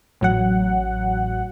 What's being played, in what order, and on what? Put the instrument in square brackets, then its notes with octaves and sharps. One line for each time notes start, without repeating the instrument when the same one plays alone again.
[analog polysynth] A1 F#3 F#5